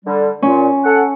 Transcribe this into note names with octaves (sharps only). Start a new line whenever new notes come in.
D3 G3
A#2 C#4
A4 F#5